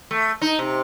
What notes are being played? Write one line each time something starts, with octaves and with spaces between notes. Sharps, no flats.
A3
D#4
C3